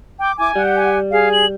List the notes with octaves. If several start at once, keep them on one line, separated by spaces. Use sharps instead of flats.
G5 D6
E4 G#5 D6
G3 G4 F#5
G#5
G#4 F5
F#7